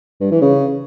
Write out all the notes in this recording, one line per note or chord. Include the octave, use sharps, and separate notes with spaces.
G2
E3
C#3